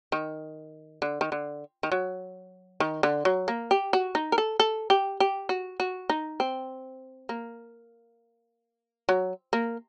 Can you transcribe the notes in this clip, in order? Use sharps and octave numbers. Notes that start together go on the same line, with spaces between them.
D#3
D3
D#3
D3
D#3
F#3
D#3
D3
F#3
A#3
G4
F#4
D#4
A#4
A4
A4
G4
G4
F#4
F#4
D#4
C4
A#3
F#3
A#3